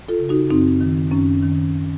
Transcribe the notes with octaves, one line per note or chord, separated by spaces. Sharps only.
F4 A4
C#3
D#4 F#4
F#2 C4 D#4
D#3
F#2 C#4
D#3